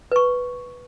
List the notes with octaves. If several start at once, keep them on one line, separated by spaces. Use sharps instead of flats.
B4 C#6